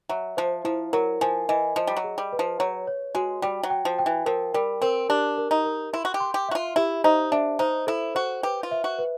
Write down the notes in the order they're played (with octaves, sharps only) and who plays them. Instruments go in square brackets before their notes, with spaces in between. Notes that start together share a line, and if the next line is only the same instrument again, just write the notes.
[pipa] F#3 [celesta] E5
[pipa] F3 [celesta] C5
[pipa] F3 [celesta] E4
[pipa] F#3 [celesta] A#4
[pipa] F3 [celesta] G#5
[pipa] E3 [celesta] D#5
[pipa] F3 [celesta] D#5
[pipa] G3
F#3
[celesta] G#4
[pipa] G3
[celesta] B4
[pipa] F3
[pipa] F#3 [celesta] C#5
[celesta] C#5
[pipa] G#3 [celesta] F#4
[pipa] G3 [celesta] G5
[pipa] F#3
[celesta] G5
[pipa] F3
[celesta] G5
[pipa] E3
[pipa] F3 [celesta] A#4
[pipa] G3 [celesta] A#4
[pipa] C4 [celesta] A#4
[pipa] D4 [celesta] G4
[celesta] A#4
[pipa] D#4
[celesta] A#4
[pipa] E4 [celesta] C6
[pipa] F#4
G4
[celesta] C6
[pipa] G4
[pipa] F#4 [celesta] E5
[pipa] F4
[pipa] E4 [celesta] G4
[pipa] D#4 [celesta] C5
[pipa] D4 [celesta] E5
[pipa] D#4 [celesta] C5
[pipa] E4 [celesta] A4
[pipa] F#4 [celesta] C5
[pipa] G4 [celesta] B4
[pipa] F4
[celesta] E5
[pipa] F#4
[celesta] B4